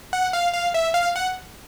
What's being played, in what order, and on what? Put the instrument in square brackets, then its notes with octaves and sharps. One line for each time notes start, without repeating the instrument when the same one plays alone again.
[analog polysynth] F#5
F5
F5
E5
F5
F#5